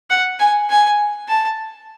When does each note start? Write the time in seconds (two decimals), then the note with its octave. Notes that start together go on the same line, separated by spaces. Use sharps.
0.10 F#5
0.39 G#5
0.70 G#5
1.29 A5